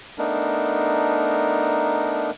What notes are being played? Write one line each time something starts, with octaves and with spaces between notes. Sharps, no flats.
A3 B3 D4 D#4 A#4